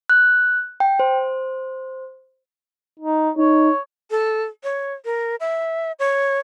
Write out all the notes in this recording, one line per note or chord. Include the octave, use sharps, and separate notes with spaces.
F#6
G5
C5
D#4
D#4 C#5
A4
C#5
A#4
E5
C#5